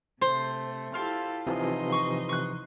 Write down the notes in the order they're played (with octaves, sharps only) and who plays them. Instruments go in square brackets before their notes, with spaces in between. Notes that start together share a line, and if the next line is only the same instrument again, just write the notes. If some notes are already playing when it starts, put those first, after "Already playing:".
[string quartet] C3 A3 [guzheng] C5
[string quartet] E4 G4 A4 [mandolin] F4 F5
[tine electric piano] C3 E3 F3 [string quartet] D#4 D#5 C6
[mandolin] C#6
C#6 F#6